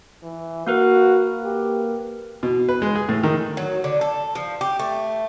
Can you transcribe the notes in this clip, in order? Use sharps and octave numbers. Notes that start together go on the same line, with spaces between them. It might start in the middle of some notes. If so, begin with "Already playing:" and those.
E3
A#3 F#4 A#4 B4
G4
B2
B4
G#3
G#4
A2
D#3
F#3
D3
A4
F3
G4
A3